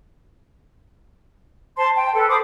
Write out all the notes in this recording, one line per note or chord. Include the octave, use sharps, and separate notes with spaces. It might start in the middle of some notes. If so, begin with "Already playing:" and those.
C5 A5 C6
G5
A4 B4
C5 B5 D6 D#6